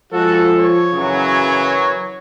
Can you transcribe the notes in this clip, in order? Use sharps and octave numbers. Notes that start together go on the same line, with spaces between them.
F3 G#3 F#4 A4
C#5
F#2 C#3 E3 F#3